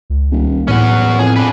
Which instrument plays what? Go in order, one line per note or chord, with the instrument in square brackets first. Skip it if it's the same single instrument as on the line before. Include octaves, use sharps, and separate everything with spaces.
[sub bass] C#2
[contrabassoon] D#1
[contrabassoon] E2 [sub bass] A2 [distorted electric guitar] C#4 F#5
[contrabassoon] F2 [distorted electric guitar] G#4
[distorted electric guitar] D4 B4